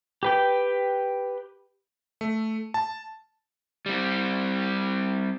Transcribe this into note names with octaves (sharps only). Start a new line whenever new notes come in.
G4 B4 G5
A3
A5
G3 C4